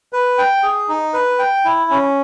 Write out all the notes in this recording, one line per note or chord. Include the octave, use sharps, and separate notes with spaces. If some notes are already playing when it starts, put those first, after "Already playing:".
B4
G5
G#4
D#4
B4
G5
E4
C#4